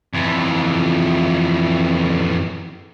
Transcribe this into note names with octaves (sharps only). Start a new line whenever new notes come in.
F2 E3